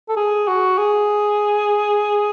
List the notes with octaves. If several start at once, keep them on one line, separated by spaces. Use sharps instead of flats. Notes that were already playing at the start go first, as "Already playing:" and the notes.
A4
G#4
F#4
G#4